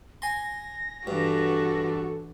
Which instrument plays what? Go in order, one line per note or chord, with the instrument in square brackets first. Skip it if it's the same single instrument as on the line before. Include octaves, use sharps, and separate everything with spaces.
[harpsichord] G#5 C6 [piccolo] A#6
[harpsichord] G2 [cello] E3 D4 [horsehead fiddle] F#4 A4